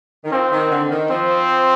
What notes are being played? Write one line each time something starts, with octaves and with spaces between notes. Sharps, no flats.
D#3
F3 C4
D#3
D3
D#3
F3 C4